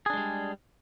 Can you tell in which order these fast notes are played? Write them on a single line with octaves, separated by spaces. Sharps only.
G#4 D4 G#3 G3